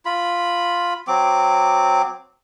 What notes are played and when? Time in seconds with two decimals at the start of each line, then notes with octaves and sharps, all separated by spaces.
0.06 F4 B5
1.08 F#3 C4 D6